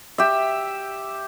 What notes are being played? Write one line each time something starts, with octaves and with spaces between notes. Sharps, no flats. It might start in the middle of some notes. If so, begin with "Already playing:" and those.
G4 E5